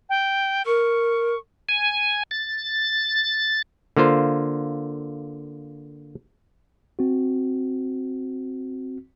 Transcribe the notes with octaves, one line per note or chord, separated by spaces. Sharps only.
G5
A#4 C#6
G#5
A6
D3 A#3 F4 C5
C4 F#4